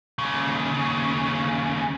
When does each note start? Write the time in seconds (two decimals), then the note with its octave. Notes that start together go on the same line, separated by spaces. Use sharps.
0.19 D#2 C#3